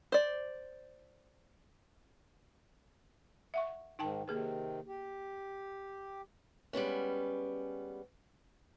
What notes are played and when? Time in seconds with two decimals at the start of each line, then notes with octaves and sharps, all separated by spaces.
0.12 C5 D5
3.54 E5 F#5 C#6
3.99 G#2 D#3 D#4 G5 A5
4.28 C3 D#3 A#3 G#4 B4
4.87 G4
6.73 G3 G#3 B3 C#4